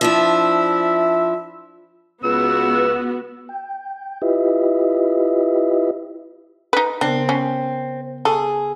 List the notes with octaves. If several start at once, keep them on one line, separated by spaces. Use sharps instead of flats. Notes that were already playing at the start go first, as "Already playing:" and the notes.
F3 D4 E4 E5
C#2 B3 F#4 E6
G5
E4 F4 G4 B4 D#5 E5
D#4 B4
C#3 B3 C4 D4 A#4
C#4
G#4 A4 C#6